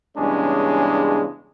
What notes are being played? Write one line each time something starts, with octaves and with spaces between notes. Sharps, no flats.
E2 G2 C#3 G#3 C#4 D4